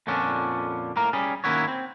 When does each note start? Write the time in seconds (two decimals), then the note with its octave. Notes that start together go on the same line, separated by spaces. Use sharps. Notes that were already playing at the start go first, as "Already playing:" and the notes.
0.07 F2 A#2 D3 C#4 D4
0.96 A2 A#3 A#4
1.13 G3 C#4 G#4
1.44 D#3 A#3 C#4 E4 F#4 C#5
1.68 C4